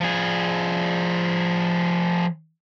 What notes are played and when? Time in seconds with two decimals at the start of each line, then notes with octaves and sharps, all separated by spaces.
0.01 F3 G#4